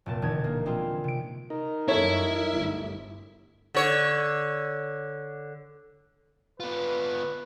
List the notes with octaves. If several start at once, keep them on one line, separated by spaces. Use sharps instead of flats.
F1 A#2 A5
E1 D3 D#4 G#6
A#3
G3 G#3 C4 E4 F4
C3 D7
D#4 A#4
F#2 E3 G3 E4 A4 C#5
G1 D2
D3 C#5
B3 F4 B4